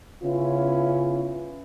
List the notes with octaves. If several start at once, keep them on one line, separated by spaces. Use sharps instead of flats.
C#3 B3 C#4 E4 F4